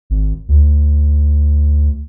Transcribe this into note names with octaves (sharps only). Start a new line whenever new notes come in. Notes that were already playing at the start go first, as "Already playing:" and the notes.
G#1
D2